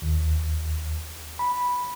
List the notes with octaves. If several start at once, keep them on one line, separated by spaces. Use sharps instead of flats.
D#2
B5